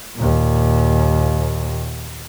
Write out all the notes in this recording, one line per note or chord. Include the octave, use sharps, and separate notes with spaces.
D#2 A#2